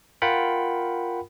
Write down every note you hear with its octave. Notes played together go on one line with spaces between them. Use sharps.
F4 A#4 F#5 G5 B5